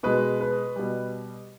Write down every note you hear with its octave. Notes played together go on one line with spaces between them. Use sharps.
B2 G#3 B4
B4
B2 G3